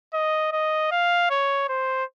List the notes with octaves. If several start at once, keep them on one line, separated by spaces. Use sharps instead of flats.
D#5
D#5
F5
C#5
C5